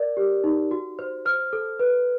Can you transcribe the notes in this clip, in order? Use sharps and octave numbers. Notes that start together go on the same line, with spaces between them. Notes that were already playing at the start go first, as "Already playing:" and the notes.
Already playing: A#4 D5
G4
D#4
F#4
C5
C5 F6
A4
B4